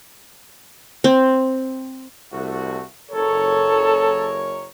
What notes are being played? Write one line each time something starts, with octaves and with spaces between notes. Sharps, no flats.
C4
C2 A3 F#4
F#1 A4 A#4 C#5